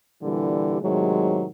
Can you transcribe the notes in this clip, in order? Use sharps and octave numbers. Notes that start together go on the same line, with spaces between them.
A#2 D3 E3 G3
A2 C3 D#3 F#3 G#3